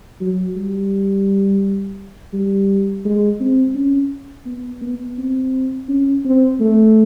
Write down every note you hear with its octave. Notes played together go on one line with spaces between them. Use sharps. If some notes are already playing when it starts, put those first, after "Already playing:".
F#3
G3
G3
G#3
C4
C#4
B3
B3
C4
C#4
C4
A3